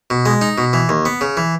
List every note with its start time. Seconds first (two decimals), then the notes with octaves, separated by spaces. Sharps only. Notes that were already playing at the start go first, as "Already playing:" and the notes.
0.10 B2
0.26 G#3
0.41 D#4
0.58 B2
0.73 E3
0.89 D#2
1.05 B3
1.21 C#3
1.37 E3